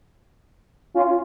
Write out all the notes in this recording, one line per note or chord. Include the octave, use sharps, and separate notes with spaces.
C#4 F4